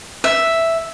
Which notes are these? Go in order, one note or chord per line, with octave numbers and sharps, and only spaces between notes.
E5